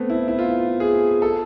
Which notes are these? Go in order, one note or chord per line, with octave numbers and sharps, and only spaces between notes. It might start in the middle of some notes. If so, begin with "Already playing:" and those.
Already playing: A3 B3 C4
E4
E4
F4
G#4
A4